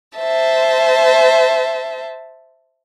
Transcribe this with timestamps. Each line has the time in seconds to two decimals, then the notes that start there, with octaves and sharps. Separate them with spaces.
0.18 C5 E5 A5